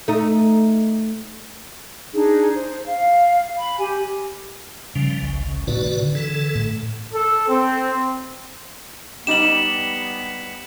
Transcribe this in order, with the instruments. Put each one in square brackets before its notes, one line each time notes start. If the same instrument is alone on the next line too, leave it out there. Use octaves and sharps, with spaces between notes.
[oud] A3 D#4
[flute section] D4 D#4 G#4
C5
F5
B5
G4 G#5
[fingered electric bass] C#3 [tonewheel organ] F3 G3
[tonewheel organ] G#1 C#2
[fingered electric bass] A2 C3 D#3 [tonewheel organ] F#4 B4 D5
[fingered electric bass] D3
[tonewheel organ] E3 A4
[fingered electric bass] A2
[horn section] A4
C4
[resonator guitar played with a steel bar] G3 D#4 G4 [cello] B3 [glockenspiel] E7 F#7